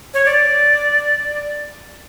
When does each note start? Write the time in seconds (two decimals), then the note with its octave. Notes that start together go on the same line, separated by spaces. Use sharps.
0.14 C#5
0.25 D5